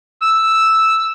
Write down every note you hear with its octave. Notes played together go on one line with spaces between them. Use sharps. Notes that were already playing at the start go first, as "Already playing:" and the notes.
E6